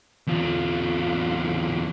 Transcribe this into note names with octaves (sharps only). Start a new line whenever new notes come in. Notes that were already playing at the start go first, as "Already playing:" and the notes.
E2 F4